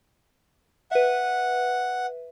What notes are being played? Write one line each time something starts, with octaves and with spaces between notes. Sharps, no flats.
B4 E5 F#5